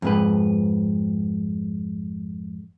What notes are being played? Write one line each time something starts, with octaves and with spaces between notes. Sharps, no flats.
F2 G#2 B4